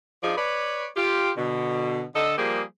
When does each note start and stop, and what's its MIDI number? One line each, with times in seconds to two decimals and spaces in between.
0.23 0.34 53
0.23 0.34 62
0.23 0.34 63
0.23 0.34 65
0.23 0.34 68
0.23 0.34 74
0.37 0.87 71
0.37 0.87 73
0.37 0.87 74
0.96 1.31 65
0.96 1.31 67
1.37 2.02 47
1.37 2.02 50
2.15 2.35 50
2.15 2.35 69
2.15 2.35 75
2.37 2.62 53
2.37 2.62 55
2.37 2.62 58
2.37 2.62 67
2.37 2.62 68